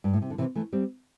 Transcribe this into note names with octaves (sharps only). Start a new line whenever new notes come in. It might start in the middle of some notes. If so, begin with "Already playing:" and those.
G2
A2
C3
D3
C3 E3
E3 A3
G3 C4